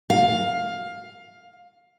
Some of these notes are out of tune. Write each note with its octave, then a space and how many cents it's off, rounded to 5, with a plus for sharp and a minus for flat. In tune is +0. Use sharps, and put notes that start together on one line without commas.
F5 +15